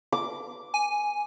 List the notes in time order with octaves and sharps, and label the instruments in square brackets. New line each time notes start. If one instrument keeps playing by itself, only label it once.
[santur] D6
[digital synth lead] G#5